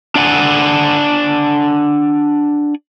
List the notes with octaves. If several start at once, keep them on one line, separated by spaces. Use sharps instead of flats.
D4 D5 F#5 G#5